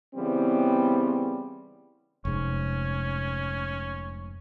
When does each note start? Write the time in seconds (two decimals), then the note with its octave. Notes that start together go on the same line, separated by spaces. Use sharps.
0.14 C#3 E3 G3 B3 C4
2.25 F1 G#2 C#4